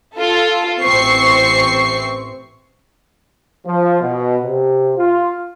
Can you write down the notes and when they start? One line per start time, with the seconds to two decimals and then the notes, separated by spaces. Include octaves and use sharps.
0.18 F4 A4
0.82 A1 E3 C4 C5 C#6 C7
3.66 F3
4.01 B2
4.44 C3
4.98 F4